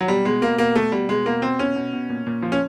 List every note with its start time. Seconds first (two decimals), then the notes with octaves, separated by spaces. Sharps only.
0.01 F#3
0.08 B2 G3
0.25 B2 G#3
0.41 B2 A#3
0.58 B2 A#3
0.75 B2 A3
0.92 B2 G3
1.09 B2 G#3
1.26 B2 A#3
1.42 B2 C4
1.59 B2 C#4
1.76 B2
1.93 B2
2.09 A#2
2.27 A#2
2.42 F3
2.52 C#4